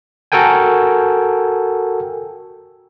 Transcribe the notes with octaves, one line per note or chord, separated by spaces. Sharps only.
F#4 A4 A#4 G5 G#5